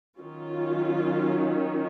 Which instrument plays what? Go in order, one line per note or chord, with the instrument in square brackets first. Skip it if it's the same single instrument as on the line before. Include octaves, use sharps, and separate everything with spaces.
[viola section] D#3 F#3 C#4 F4